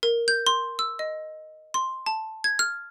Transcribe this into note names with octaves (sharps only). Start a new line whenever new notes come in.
A#4
G6
C6
E6
D#5
C6
A5
G#6
F6